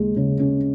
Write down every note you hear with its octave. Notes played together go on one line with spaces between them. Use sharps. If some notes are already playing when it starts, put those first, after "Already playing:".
Already playing: D#2 C#3 G#3
C#3
C#4